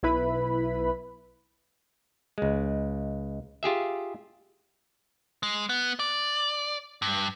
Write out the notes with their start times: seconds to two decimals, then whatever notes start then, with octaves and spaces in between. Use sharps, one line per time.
0.03 B1 E4 B4 B5
2.38 C#2 G#3
3.63 F4 G4 G#4 E5
5.43 G#3
5.69 B3
5.99 D5
7.02 G2